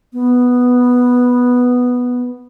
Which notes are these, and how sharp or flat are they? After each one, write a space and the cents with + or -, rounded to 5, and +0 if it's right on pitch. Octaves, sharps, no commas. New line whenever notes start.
B3 +0